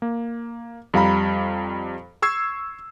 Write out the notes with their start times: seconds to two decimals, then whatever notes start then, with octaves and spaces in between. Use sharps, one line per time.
0.02 A#3
0.94 F2 G3 F5 A#5 B5
2.22 C#6 E6 G#6 C7